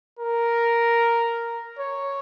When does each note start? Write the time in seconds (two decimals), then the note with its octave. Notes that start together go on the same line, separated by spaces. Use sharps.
0.19 A#4
1.79 C#5